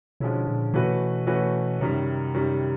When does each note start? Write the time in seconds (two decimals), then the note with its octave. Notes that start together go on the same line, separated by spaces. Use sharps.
0.20 B2 D3 F3 G#3 C#4 E4
0.47 A#2
0.74 B2 E3 A3 C#4 F#4 B4
1.27 E3 A3 C#4 F#4 B4
1.80 F#2 C3 D#3 G3
2.34 F#2 D#3 G3